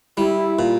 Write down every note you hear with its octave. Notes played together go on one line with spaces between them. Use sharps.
G3 E4
A#2